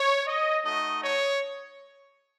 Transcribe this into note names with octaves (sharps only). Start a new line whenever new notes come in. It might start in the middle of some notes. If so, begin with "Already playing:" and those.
Already playing: C#5
D#5
A3 D#4 F#4 D#5
C#5